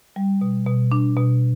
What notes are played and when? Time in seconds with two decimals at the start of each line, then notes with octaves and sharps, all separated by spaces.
0.16 G3
0.41 B2
0.66 B2
0.92 D4
1.17 B2